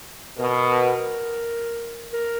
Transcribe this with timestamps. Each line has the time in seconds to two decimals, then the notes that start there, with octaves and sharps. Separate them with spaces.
0.38 B2 A#4
2.13 A#4